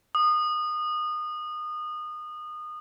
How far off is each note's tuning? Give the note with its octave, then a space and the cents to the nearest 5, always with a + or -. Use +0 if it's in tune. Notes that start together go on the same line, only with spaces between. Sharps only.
D#6 -25